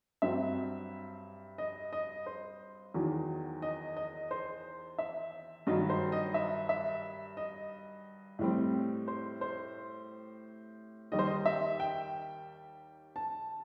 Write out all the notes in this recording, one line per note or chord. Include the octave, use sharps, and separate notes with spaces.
G2 F#3 C4 E5
D#5
D#5
C5
E2 D#3 F#3
D#5
D#5
C5
E5
G2 D#3 F#3 D#5
C5
D#5
E5
E5
D#5
A2 G3 C4
C5
C5
D#2 D#3 G3 D#5
C5
D#5
E5
G5
A5